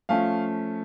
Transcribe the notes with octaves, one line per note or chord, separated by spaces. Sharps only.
F3 A3 C#4 F5